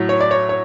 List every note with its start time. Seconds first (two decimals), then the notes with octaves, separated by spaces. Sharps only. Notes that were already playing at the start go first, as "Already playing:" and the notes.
Already playing: A2 F#3
0.09 C#5
0.21 D5
0.31 C#5
0.49 C#5